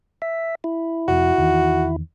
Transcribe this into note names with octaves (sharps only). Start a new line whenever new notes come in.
E5
E4
F1 F2 F#4
E2 D#3